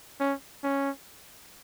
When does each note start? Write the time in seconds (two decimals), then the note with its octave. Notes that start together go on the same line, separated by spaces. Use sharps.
0.20 C#4
0.64 C#4